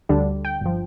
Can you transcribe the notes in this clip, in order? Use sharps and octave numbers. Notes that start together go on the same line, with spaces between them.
D2 D3 G3 D4
G5
G1 F3